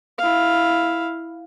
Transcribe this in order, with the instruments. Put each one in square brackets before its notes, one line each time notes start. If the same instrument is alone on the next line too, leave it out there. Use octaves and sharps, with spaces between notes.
[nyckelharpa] E4 F5